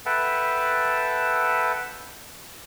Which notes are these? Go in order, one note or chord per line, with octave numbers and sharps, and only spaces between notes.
A4 B4 E5 F#5 G5 A5